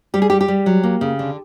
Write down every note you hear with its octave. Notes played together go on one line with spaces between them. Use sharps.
G3 G4
G#4
G3 G4
G4
G3
F#3
A#3
C#3
D3